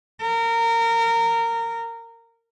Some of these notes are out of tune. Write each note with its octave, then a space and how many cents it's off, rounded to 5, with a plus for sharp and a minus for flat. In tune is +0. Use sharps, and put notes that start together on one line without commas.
A#4 -20